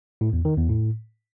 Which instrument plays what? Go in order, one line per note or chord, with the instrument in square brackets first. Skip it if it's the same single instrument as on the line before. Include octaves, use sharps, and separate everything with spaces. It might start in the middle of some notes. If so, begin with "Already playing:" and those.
[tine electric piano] A2
E2
D#3
E2
A2